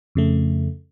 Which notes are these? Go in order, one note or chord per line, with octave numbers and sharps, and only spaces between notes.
F2 C#3 A3